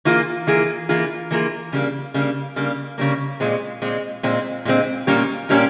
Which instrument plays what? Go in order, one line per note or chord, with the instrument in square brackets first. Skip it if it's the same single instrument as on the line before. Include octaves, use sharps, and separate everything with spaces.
[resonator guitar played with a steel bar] E3 A#3 F4 G#4
E3 A#3 F4 G#4
E3 A#3 F4 G#4
E3 A#3 F4 G#4
C#3 G3 A#3
C#3 G3 A#3
C#3 G3 A#3
C#3 G3 A#3
A#2 G#3 C4
A#2 G#3 C4
A#2 G#3 C4
A#2 G#3 C4
A#2 G3 A#3 C#4 G4
A#2 G3 A#3 C#4 G4